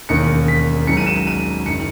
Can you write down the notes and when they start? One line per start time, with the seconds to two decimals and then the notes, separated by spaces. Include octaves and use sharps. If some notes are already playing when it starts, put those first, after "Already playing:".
0.09 E1 D#2 D#3 A#3 C#4 C#7
0.48 B6
0.87 G#1 G#2 F#3 C#4 C#7
0.97 D#7
1.06 E7
1.16 E7
1.27 D#7
1.66 F#1 C#7
1.70 D#3